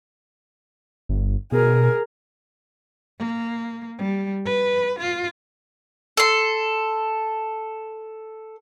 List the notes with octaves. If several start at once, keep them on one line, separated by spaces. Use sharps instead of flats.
G1
B2 G#4 A#4
A#3
G3
B4
F4
A4 C6